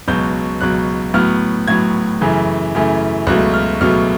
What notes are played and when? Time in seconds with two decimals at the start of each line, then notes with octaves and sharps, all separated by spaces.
0.08 C#2 B2 F#3 G6
0.61 C#2 B2 F#3 F#6
1.14 A2 F#3 B3 F6
1.67 A2 F#3 B3 G#6
2.21 F#2 C#3 E3 A3
2.75 F#2 C#3 E3 A3
3.27 C#2 B2 F#3 A3 F#6
3.54 F6
3.81 C#2 B2 F#3 A3 F6